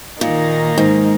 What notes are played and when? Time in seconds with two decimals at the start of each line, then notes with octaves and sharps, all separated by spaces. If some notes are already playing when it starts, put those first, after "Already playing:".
0.21 A#2 D#3 A#3 D#4
0.78 G#2